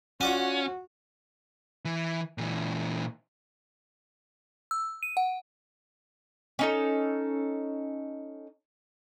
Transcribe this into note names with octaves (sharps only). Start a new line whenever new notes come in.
C#4 F4 F#4 D5 F#5
E3
A#2 E3
E6
D#7
F#5
C#4 D#4 A4